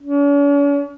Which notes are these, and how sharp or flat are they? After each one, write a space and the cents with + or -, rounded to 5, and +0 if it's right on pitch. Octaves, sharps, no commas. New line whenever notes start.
C#4 +45